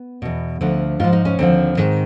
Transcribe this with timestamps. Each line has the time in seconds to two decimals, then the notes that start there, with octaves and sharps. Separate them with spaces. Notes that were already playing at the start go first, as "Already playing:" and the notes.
Already playing: B3
0.22 E2 B2
0.61 D2 D3 F3
1.00 G#2 F3 F4
1.13 D#4
1.25 C#4
1.39 D#2 D3 F3 C4
1.77 G#2 D#3